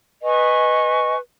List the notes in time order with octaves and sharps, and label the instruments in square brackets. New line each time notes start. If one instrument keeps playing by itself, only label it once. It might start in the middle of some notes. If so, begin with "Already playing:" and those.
[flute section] B4 D#5 G#5 C#6